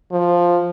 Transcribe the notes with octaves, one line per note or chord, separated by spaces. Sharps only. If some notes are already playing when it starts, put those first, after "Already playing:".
F3